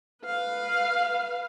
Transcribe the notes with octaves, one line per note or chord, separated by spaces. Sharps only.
B4 F5